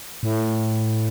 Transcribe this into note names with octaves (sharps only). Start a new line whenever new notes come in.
A2